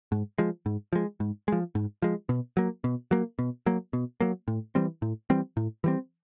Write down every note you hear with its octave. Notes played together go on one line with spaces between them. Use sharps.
G#2
F3 G#3
G#2
F3 G#3
G#2
F3 G#3
G#2
F3 G#3
B2
F#3 A#3
B2
F#3 A#3
B2
F#3 A#3
B2
F#3 A#3
A2
E3 G3 C4
A2
E3 G3 C4
A2
E3 G3 C4